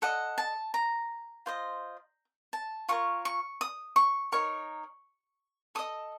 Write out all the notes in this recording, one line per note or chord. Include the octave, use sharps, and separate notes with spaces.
A4 D#5 F#5
A5
A#5
F4 C5 D#5
A5
F4 A#4 C#5 C#6
C#6
D#6
C#6
D#4 A#4 C#5 C#6
A4 D#5 D#6